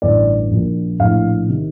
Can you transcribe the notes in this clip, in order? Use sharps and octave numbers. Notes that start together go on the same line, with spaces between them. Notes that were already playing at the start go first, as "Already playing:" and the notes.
A1 G2 D3 D5
A#1 A#2
A#1 A2 F5
C3 D#3